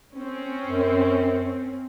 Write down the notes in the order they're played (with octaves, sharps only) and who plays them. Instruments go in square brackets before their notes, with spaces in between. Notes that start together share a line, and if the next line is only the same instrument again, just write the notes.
[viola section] C4 C#4
[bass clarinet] F#2